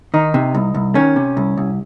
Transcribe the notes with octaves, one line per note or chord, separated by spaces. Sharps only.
D#3 D#4
C3
C2
C2
D#3 C#4
C3
C2
C2